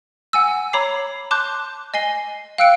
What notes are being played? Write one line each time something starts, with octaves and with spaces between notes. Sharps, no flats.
F#5 G#5 E6
C#5 A#5 B5 D6 C7
A5 C6 D6 F#6 G6
D#5 G#5 C7 G7
F5 G5 E6 F#6 C#7 D7